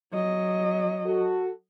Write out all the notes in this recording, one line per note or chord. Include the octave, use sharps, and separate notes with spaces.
F#3 D#5
F#4 A4